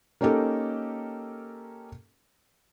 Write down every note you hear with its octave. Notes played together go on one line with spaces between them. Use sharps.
A#3 C#4 D#4 G4 A4 A#4